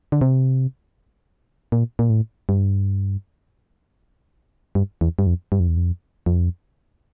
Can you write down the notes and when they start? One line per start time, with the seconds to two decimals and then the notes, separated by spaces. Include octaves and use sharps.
0.12 D3
0.21 C3
1.72 A#2
1.99 A#2
2.10 A2
2.49 G2
4.75 G2
5.01 E2
5.19 G2
5.27 F2
5.52 G2
5.60 F2
5.68 E2
5.77 F2
6.26 F2